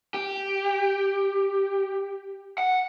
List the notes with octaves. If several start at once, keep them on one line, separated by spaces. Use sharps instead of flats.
G4
F#5